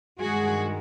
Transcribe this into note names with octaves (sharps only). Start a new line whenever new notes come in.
G2 D#3 G#3 F#4 G#4